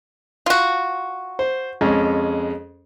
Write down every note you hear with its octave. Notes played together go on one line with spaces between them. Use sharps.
F4 F#4
C5
F2 G#3 C#4